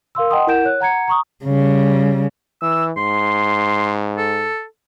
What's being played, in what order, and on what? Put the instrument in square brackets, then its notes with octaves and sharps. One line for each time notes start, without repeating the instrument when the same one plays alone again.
[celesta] A#4 F5 C6 E6
D#5 F#5 G5 A5 C6 D#6
E4 A#4 F#5 G6 D7 E7
C#5 F#6
F#5 A#5 G#6 C#7
A#5 C#6 D#6
[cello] C#3 G3
[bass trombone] E3 [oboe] E6
[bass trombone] G#2 [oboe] C6
[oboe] A4